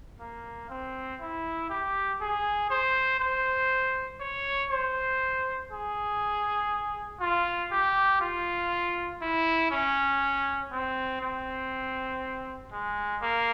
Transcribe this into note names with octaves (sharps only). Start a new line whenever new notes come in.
A#3
C4
E4
G4
G#4
C5
C5
C#5
C5
G#4
F4
G4
F4
E4
C#4
C4
C4
G#3
A#3